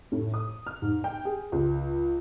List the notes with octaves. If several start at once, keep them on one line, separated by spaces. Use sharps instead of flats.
A2
D#6
F6
G#2
G5
G#4
C#2